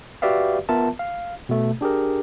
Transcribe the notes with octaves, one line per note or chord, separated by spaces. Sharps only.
F#4 G4 B4 D5 E5 F5
B3 F4 A#4 E5 A5
F5
B2 A3
D4 G4 G#4 A#4